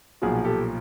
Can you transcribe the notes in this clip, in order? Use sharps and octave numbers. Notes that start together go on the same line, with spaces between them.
B1 A#2 F3 F#4 G#4
G4 A4